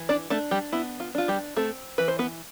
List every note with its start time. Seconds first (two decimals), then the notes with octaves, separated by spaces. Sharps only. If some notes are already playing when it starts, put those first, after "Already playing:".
Already playing: E3
0.09 D4 D5
0.30 A3 D4 A4
0.51 G3 G4
0.72 B3 E4
1.00 F4
1.15 D4 F4
1.28 G3 G4
1.57 A3 C4 A4
1.98 E3 B4
2.08 C5
2.19 B3 B4